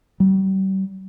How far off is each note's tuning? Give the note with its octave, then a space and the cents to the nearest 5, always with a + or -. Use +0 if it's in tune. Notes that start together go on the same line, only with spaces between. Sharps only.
G3 -40